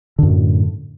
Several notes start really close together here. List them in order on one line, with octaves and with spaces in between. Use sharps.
D3 F#2 A2